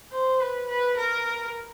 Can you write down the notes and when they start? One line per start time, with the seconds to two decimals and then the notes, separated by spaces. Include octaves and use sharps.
0.12 C5
0.40 B4
0.68 B4
0.97 A#4